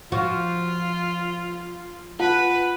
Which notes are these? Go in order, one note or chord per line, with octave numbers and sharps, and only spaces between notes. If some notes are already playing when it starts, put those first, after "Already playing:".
F3 F4 F#4
F4 B4 F#5 A5